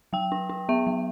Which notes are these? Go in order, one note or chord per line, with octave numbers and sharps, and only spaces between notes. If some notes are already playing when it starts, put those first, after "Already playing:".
F#3 G5
D4
D4
B3 E5
F#3